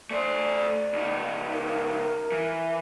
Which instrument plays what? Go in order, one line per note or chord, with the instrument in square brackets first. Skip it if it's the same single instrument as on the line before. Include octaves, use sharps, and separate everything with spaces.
[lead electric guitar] A3 C5 [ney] D5
[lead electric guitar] C#2 D#4
[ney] A#4
[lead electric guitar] E3